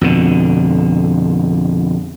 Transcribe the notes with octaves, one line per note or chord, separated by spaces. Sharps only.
F2 B2 D3